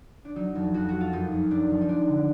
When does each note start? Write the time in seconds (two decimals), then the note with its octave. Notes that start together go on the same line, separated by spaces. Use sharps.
0.25 D4
0.36 F#3 D#4
0.55 F2
0.74 F2 F#4
0.89 F#3 F#4
1.01 F4
1.12 F#2 D#4
1.32 F#2
1.50 F#2 D4
1.70 F3
1.81 D#4
1.89 G#3 D4
2.08 D3